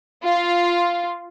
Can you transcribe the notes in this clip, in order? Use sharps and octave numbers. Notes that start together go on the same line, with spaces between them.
F4